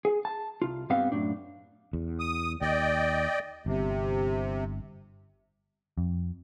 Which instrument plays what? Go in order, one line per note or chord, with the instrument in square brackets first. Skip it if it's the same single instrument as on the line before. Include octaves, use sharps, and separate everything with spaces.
[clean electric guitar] G#4
A5
C2 F4
G2 G3 B3 C4 F5
F#2 A2 D4
[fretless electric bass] E2
[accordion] D#6
[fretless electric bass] D#2 [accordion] D5 D#5 G5
[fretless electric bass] G1 [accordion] C3
[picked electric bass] F2